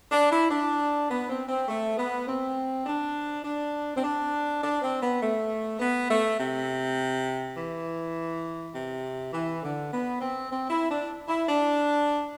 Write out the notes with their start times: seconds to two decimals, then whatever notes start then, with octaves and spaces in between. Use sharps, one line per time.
0.11 D4
0.31 E4
0.50 D4
1.09 B3
1.29 C4
1.48 C4
1.68 A3
1.97 B3
2.27 C4
2.86 D4
3.44 D4
3.95 C4
4.03 D4
4.62 D4
4.82 C4
5.02 B3
5.21 A3
5.80 B3
6.09 A3
6.39 C3
7.56 E3
8.74 C3
9.33 E3
9.62 D3
9.92 B3
10.21 C4
10.50 C4
10.70 E4
10.90 D4
11.28 E4
11.48 D4